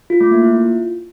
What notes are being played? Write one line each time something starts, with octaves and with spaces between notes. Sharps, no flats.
F4
A3
A#3
E4
F4